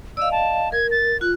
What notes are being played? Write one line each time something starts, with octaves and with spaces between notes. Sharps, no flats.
D5 D#5 F5 E6
A5
A#4 G#6
A6
F4 F#6